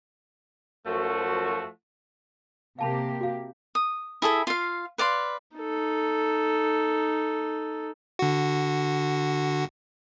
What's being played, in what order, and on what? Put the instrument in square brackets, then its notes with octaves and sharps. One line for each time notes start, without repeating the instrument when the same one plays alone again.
[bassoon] F#2 [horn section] F3 A3 F#4
[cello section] C3 A#3 G4 [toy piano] F5 A5 B5
[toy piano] F#4 F5
[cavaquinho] D#6
E4 G#4 A4 E5
F4 F5
B4 D5 F5 C6
[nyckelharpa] D#4 A4
[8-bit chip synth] D3 F#4